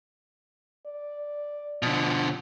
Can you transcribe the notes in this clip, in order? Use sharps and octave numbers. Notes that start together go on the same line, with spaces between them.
D5
B2 D3 F3